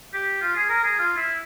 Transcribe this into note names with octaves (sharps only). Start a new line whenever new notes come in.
G4
F4
G#4
A#4
G#4
F4
E4